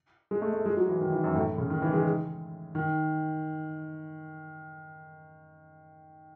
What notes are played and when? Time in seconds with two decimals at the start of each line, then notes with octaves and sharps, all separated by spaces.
0.31 G#3
0.42 A3
0.54 A3
0.66 G#3
0.77 F#3
0.88 E3
1.01 D#3
1.12 E3
1.24 F#2
1.35 A2
1.58 C#3
1.70 D#3
1.82 E3
1.93 G#3
2.75 D#3